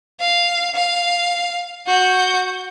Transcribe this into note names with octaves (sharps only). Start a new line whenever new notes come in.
F5
F5
F#4 G6